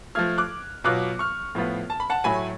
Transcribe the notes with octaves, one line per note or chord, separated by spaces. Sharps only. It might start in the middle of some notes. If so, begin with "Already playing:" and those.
F3 A3 F4 F6 G#6
D6 F#6
B2 F#3 B3 F4 D6 F#6
C#6 F6
A2 F3 B3 F4
A5
B5
F#5 A5
A2 F#3 A3 G#5 B5